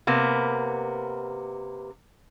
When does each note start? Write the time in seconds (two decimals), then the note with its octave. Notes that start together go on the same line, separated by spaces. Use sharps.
0.07 C3 A#3 B3